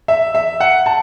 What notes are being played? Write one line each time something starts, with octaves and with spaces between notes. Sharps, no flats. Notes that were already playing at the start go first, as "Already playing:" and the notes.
E5
E5
F#5
A5